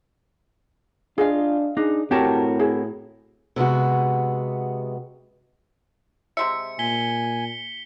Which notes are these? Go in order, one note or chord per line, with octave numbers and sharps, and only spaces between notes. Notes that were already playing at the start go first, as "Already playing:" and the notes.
D4 F4 G#4 D#5 F5
D4 D#4 G#4
A2 C4 F#4 G4 A#4 C#5 A5
E4 G#4
C3 G#3 B3 F#4
C3 G#3 E5 C#7
A#2 G#5 B6 G7